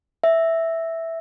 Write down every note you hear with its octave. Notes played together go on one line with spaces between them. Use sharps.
E5